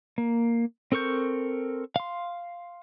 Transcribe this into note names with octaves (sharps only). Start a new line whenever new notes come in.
A#3
C4 A4 A#4 C#6 G6
F5 C6